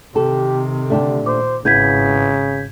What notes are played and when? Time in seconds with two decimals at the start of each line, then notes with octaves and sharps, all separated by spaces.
0.16 C3 D#3 G4 A4
0.90 D3 A3 D4 G4
1.26 A#2 C5 D6
1.65 G#1 C#3 B3 E4 B4 G6 G#6 B6